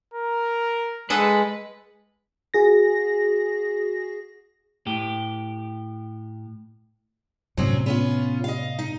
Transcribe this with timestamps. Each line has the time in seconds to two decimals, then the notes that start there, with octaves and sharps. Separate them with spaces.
0.14 A#4
1.10 G#3 G#4 A4 B4 F#5
2.54 F#4 G#4 A#6
4.86 A2 G4
7.57 A2 C3 F#3 C4 C#4
7.86 B3 C#4 F4
8.44 D#5 F5
8.79 D#4